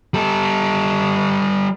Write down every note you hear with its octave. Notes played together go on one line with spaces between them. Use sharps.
G3 A4